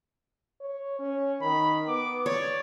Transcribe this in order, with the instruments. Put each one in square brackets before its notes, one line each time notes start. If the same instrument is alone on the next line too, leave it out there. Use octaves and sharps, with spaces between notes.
[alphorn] C#5
C#4
[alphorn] D#3 [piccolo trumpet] B5
[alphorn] B3 [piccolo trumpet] D6
[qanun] C#5 [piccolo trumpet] D5